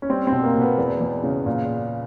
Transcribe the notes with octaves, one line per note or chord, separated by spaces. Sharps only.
C#4
G3 C4
C4
B2
A#3
B2
B3
E2
E2
C#3
A#2